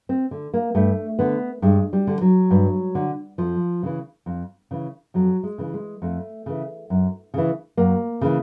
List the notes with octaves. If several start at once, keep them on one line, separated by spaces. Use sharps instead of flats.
C4
D3
A#3
G2 A3
D3 B3
G2 G#3
G3
D3
F#3
G2
D3
F2 F3
C#3 E3
F2
C#3 E3
F2 F#3
G#3
C#3 E3
G#3
F2 A3
C#3 E3
F#2
C#3 E3
F#2 A#3
C#3 E3